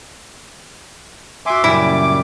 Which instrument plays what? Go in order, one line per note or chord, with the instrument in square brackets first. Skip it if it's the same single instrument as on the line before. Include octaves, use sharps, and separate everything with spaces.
[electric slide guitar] F#4 G#5 [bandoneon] E5 C6 D6
[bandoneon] F#2 G3 [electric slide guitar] A#2 C#3 G#5 [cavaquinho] E4 [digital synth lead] D6